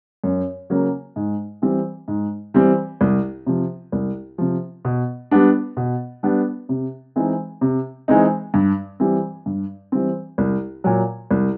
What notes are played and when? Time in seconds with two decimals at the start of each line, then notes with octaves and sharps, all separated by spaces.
0.24 F#2
0.70 C#3 F#3 A#3
1.16 G#2
1.62 E3 G3 C4
2.08 G#2
2.54 E3 G3 C4
3.01 C2
3.46 C3 F3
3.92 C2
4.38 C3 F3
4.85 B2
5.31 G3 B3 D4
5.77 B2
6.23 G3 B3 D4
6.69 C3
7.16 E3 G#3 C4 D#4
7.61 C3
8.08 E3 G#3 C4 D#4
8.54 G2
9.00 E3 G3 C4
9.46 G2
9.92 E3 G3 C4
10.38 C2
10.84 A#2 F#3
11.31 C2